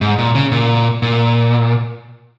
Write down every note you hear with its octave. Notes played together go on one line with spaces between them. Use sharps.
G#2
A#2
C#3
A#2
A#2